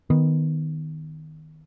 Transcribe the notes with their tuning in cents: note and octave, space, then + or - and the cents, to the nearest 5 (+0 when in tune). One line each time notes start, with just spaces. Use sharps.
D#3 +0 B3 +0